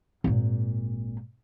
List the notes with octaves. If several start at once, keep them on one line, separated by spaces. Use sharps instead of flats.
G#1 A#2